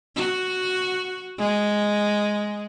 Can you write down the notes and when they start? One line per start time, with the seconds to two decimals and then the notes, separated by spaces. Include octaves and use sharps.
0.16 F#4
1.38 G#3